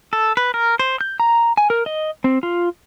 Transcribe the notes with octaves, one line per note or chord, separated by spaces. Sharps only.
A4
B4
A#4
C5
G6
A#5
G#5
A#4
D#5
C4
F4